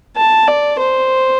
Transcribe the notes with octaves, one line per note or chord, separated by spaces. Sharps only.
A5
D5
C5